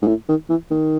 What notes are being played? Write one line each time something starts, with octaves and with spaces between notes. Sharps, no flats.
G#2
A2
D#3
E3
D#3